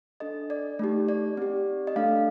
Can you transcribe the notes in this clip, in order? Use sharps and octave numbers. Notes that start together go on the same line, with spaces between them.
D4 A4 D#5
D5
A3 D#4 G4
D5
C4 G4
D#5
A3 D4 A4 F5